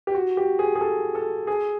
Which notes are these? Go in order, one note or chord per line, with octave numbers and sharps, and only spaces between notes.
G4
F#4
G4
G#4
G#4
A4
A4
G#4